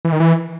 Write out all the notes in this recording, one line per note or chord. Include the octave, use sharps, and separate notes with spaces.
E3
D#3
E3